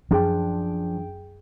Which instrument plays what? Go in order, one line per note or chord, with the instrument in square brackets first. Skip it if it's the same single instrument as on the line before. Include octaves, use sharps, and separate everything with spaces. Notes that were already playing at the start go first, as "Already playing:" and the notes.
[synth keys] F#2 G#4 G5 [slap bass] F3 D4